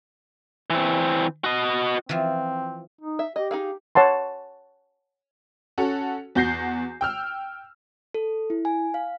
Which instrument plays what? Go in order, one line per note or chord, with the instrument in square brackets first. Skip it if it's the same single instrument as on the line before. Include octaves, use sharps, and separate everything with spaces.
[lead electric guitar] E3 C4
F#4 D#5
[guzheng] E3 F3 [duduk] C4
[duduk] D#4
[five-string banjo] E5
[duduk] G4 [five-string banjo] D#5
[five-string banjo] D#4 G#4 F5
[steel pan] C#5 F#5 A5 C6
[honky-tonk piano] C#4 F#4 A4
E2 F#4 G6 A#6 C7
G5 E6 F6
[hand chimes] A4
E4
G#5
F5